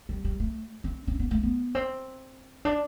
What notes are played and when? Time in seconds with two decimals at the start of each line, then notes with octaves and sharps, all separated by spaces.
0.09 G3
0.25 G3
0.40 A3
0.84 C4
1.07 C4
1.19 B3
1.31 A3
1.43 B3
1.75 C4
2.65 D4